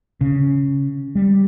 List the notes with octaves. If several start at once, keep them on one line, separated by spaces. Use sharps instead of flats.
C#3
G3